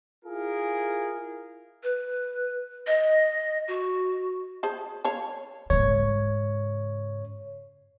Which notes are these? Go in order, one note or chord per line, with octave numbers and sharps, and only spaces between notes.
E4 F4 G#4 A#4
B4
D#5
F#4
G#4 C5 A5
C#5 F5 A5
G#2 C#3 C#5